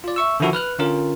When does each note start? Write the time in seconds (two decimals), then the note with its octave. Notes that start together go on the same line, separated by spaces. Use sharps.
0.04 F4 D5
0.16 E5 C#6 E6
0.40 D3 D#3 F3 E4 F#4 A4
0.53 B4 F6 F#6
0.79 D3 C#4 F4 A#4